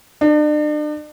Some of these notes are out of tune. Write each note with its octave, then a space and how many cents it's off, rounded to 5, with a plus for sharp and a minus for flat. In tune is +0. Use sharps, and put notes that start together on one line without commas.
D4 +40